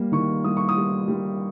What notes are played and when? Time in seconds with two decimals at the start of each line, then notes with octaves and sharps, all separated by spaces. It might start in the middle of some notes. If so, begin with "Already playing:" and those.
Already playing: G3 A#3
0.12 D#3 C#6
0.44 G3 D#6
0.57 C#6
0.69 D#6
0.76 G3
1.08 G3